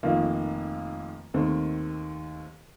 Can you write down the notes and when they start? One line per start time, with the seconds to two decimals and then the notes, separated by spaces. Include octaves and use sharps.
0.03 F1 F2 D#3 A#3 F4
1.34 D#2 D#3 A3 C4